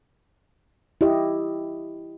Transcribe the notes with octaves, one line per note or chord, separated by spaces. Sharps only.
E4 G4 D#5